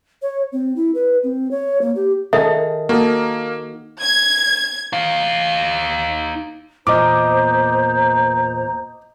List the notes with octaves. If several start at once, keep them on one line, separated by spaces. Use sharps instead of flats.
C#5
C4
E4
B4
C4
C#5
A#3
G4
D#3 G#4 A4 E5
A#3 F#4 A4 D#5
G#6
D#4 F5
E2 A#2 C5 D#5 A#5 D6